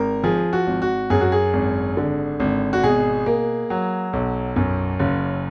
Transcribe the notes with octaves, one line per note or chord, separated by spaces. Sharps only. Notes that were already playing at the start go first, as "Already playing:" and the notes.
Already playing: G#1 A#4
F3 G#4
F#4
G#1
F#4
F#2 G#4
F#4
G#4
G#1
D3
G#1
F#4
B2 G#4
A#3
F#3
B1
F#2
F#1